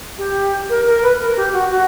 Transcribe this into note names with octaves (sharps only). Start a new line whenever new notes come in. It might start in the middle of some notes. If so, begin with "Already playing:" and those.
G4
A#4
A#4
B4
A#4
G4
F#4
F#4